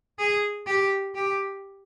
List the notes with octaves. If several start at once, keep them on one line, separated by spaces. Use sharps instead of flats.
G#4
G4
G4